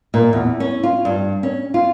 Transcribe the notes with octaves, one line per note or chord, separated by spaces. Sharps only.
A#2
E2
C#4
F4
G2
C#4
F4